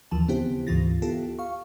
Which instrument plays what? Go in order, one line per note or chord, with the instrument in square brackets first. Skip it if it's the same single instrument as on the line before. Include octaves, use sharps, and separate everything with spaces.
[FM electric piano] D#2 E3 F3 A5
C#3 B3 C4 E4 G4 C5
D2 G#2 E3 F4 A6 A#6
B3 E4 F4 G4 A4
F5 C#6